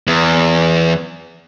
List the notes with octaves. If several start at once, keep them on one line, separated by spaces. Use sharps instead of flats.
E2